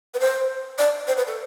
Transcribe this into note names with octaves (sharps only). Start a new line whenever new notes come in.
B4
C5
D5
C5
B4
A4